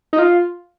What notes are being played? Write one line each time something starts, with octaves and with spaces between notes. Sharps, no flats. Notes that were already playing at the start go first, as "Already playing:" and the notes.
D#4
F4